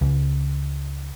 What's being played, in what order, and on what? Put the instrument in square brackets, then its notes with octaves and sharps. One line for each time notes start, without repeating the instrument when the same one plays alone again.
[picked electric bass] C#2